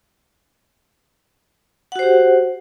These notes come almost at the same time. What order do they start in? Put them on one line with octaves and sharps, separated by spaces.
F#5 F#4 C5 G4